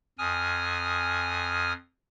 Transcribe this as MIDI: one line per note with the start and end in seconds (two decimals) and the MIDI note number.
0.18 1.73 41
0.18 1.73 80
0.18 1.73 87
0.18 1.73 89